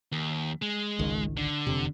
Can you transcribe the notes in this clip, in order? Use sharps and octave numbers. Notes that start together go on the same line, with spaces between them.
D#2
G#3
G#1 C#2 D#3
D3
E1 F2 C3